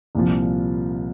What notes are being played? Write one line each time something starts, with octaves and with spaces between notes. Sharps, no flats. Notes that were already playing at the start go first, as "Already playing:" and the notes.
C2 A#2 F3